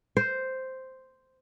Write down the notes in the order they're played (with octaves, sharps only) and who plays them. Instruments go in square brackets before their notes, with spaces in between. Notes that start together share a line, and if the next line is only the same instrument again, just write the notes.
[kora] C5